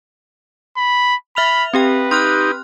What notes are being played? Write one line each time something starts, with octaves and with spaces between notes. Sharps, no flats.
B5
E5 B5 F6 F7
C4 G4 B4 G5
D#4 G4 C6 F6 F#6